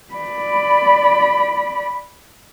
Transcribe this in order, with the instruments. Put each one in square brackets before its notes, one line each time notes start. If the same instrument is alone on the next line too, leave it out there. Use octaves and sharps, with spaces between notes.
[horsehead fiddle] D5 B5